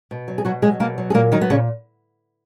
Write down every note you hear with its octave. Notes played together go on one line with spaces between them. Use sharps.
B2
F#3
G#4
B2 F#3 F#4
F#3 G#3 G#4
B2 A#3 A#4
F#3
G#4
A#2 A#3 A#4
D#3 F#3 D#4
B3
A#2 C#3 C#4